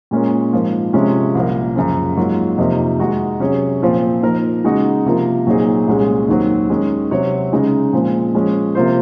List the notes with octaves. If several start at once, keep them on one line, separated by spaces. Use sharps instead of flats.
A#2 G#3 C#4 F4 A#4
G#2 F3 A#3
C3 F3 G#3 C#4 F4
C2 A#2 F3 A#3
F#2 C#3 F3
G#2 F#3 A#3 F4
F2 C3 F3 A#3 D#4
D#3 G#3 D#4 F#4
C3 F#3 C#4 G#4 C#5
A#2 F3 C4 F4
F3 A#3 D#4 A#4
C#3 G#3 D#4 F#4
C3 F3 A#3 F4 A#4
A#2 F#3 C4 D#4 G#4
C2 A#2 G#3 C#4 G#4
D#2 D#3 F#3 C4
D#3 G#3 C#4
C3 F#3 C4 F#4 C#5
C#3 G#3 D#4
A#2 F3 G#3 C4
F3 G#3 C#4
C3 F3 A#3 F4 C5